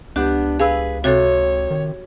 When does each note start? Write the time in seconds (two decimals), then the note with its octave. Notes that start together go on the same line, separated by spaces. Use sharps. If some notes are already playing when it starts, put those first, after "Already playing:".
0.16 C#2 B3 D4 G4
0.60 G#4 B4 F5 E6
1.04 C3 F#4 A4 C#5
1.71 D#3